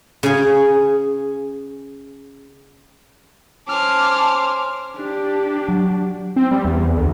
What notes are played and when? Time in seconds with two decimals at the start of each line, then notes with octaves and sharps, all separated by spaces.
0.23 C#3 G#4
3.67 C#4 C5 A5 D6 F6
4.95 D4 G4
5.68 F#3
6.36 C4
6.51 G3
6.65 E2
6.97 D2